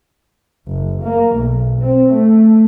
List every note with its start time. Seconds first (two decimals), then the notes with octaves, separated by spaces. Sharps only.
0.67 F#1
1.03 A#3
1.36 B1
1.81 C4
2.13 A3